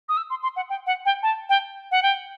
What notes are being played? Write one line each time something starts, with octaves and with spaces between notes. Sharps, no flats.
D#6
E6
C6
C6
F#5
G5
F#5
G5
A5
G5
F#5
G5